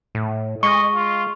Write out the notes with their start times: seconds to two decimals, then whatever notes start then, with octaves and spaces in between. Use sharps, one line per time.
0.15 A2
0.63 G#3 D#5 C#6
0.95 F4